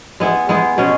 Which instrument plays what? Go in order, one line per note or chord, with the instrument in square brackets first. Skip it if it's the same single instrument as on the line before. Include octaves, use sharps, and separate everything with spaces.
[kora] G#3 B3 E4
G#3 B3 E4
B2 G#3 C#4